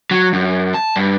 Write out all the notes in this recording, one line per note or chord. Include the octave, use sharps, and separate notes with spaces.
F#3
F#2
A5
G2